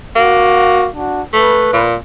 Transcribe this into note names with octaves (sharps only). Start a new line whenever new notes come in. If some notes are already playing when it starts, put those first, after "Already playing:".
A#3 F#4
D4 F#4
A3 B4
A#2